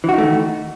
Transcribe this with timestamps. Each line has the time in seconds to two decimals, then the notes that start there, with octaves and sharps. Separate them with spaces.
0.04 E3
0.09 F#4
0.14 D#4
0.18 A3
0.23 D#3